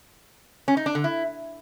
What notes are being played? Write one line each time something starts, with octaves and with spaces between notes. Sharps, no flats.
C#4
D#4
D4
D3
E4